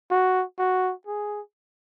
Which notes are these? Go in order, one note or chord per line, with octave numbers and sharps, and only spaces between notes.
F#4
F#4
G#4